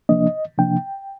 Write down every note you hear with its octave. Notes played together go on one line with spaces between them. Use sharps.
C3 F3 A#3 D4 D#5
C3 F3 A#3 D4 G5